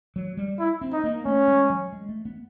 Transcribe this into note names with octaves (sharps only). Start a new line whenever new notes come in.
F#3
G3
E4
C4
D#4
A#3
A3 C#4
G#3
F#3
G#3
A3
B3